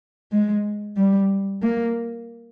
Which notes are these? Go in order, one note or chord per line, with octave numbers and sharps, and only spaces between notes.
G#3
G3
A#3